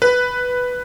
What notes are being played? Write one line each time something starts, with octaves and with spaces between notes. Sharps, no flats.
B4